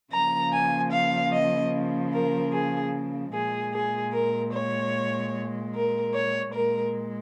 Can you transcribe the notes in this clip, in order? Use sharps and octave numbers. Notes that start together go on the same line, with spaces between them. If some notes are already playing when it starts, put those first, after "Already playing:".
C#3 F3 A#3 A#5
G#5
F5
D#5
A#4
G#4
A#2 G#3 G#4
G#4
A#4
C#5
A#4
C#5
A#2 G#3 A#4